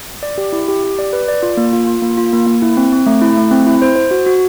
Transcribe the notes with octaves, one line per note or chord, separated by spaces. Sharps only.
D5
G4
E4
G4
G4
D5
B4
D5
F4
A#3
F4
F4
A#3
F4
A#3
A#3
E4
C4
C4
A3
E4
A3
C4
E4
C5
C5
F#4
F#4